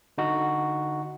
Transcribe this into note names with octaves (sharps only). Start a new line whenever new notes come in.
D3 D#4 F#4